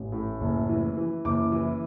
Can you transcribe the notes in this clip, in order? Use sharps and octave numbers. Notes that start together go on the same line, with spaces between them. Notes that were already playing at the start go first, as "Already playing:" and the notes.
Already playing: A1
A2
F#1
E3
E3
F#1 D6
E3